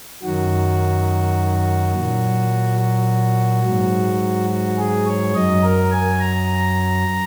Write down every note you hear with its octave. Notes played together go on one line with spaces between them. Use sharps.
F#2 D#3 F#3 F#4
A#2 F#3
F#4
G#2 F#3
F#4
G#4
C#5
F#2 F#3 D#5
A#4
G#5
A#5